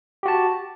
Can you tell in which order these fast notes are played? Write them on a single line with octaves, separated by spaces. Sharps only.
G4 F#4 A5